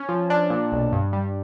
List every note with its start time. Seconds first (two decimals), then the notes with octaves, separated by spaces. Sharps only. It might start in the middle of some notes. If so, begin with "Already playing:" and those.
Already playing: C#4
0.09 F3
0.30 D4
0.50 A#2
0.72 B1
0.92 G2
1.13 G3